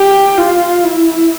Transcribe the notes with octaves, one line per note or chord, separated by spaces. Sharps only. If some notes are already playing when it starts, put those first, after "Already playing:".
Already playing: G4
F4
E4